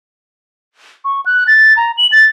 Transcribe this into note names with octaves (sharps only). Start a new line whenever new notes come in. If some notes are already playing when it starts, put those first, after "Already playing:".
C#6
F#6
A6
A#5
F#7
A6